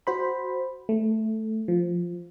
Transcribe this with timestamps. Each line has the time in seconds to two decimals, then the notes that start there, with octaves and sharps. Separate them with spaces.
0.07 F#4 C5 B5
0.89 A3
1.68 F3